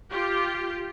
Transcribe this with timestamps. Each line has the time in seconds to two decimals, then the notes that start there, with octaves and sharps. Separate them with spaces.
0.11 F4 G4